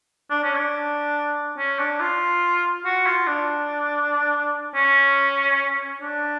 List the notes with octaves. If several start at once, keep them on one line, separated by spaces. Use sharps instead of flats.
D4
C#4
D4
C#4
D4
F4
F#4
F4
D4
C#4
D4